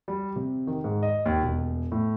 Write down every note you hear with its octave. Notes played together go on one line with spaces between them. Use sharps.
G3
C3
D#3
G#2
D#5
D#2
E1
A2